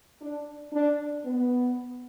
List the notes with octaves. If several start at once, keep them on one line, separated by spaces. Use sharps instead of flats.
D4
D4
B3